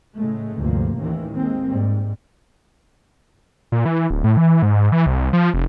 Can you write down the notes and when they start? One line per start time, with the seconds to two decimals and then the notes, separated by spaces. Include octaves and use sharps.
0.18 A2 C#3 G#3 A3
0.57 D2 G2 C3 F3 A#3
0.98 A1 D#2 D#3 E3
1.35 G#3 A#3 C4
1.71 G#2 G3
3.72 A#2
3.85 E3
4.10 D1
4.24 A2
4.37 E3
4.62 G#2
4.92 E3
5.06 C2
5.33 F3
5.54 F1